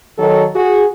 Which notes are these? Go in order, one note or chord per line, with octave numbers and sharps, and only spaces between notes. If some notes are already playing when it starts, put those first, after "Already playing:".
D#3 F#3 A4
F#4 G#4